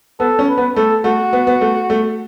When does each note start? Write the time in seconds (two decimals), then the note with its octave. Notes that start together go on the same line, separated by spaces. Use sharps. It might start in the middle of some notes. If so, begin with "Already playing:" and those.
0.20 B3 A4
0.39 C#4
0.48 B4
0.58 B3
0.76 A3 A4
1.04 A3 F#4
1.33 B3
1.47 B3
1.61 A3
1.90 A3